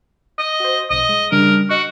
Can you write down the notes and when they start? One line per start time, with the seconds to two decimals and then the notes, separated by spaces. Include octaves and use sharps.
0.39 D#5
0.60 F#4 C5
0.90 A#1 B2 D#5
1.09 G#3
1.32 C#3 G3 D4 A#4
1.70 F#4 D#5 C#7 D7